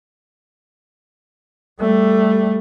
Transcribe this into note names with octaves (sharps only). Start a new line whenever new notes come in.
G3 A3